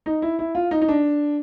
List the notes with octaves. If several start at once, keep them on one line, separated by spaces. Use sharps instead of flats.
D#4
E4
E4
F4
D#4
D#4
D4